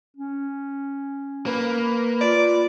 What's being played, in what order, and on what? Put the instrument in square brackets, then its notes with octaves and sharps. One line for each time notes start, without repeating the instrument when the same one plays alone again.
[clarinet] C#4
[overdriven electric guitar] A#3 [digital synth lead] B4
[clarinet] F4 [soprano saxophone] D5